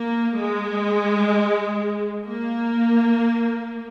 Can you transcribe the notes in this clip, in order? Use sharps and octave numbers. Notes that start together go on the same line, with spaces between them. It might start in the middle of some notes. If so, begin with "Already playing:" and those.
Already playing: A#3
G#3
A#3